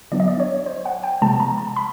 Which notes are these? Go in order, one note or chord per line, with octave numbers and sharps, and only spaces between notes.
D3 F#3 B3 D4 D5
D#5
D5
C#5
C5
F#5
G5
C3 F3 G#3 B3 A5
A#5
A5
B5